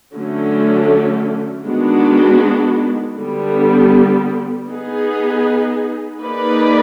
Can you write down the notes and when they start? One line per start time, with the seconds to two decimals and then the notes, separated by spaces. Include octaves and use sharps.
0.14 D3 F#3 A3 C#4
1.66 D#3 G#3 B3 D4 F#4
3.17 D3 G3 B3
4.68 B3 D#4 G#4
6.19 A#3 D#4 G#4 B4 D5